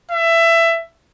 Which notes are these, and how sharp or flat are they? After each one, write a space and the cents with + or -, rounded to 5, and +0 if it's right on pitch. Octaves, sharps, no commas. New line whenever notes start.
E5 +20